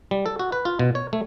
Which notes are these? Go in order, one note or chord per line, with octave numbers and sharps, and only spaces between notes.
G3
A4
F#4
B4
F4
B2
C#5
A3